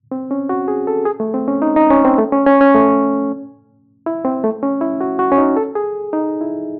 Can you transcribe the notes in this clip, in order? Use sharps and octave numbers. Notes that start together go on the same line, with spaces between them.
C4
C#4
F#4
G#4
A4
G#4
A3
C4
C#4
D#4
D#4
C#4
C4
A3
C#4
C#4
C#4
A3
E4
C4
A3
C#4
E4
F#4
F#4
C#4
D#4
A4
G#4
D#4
E4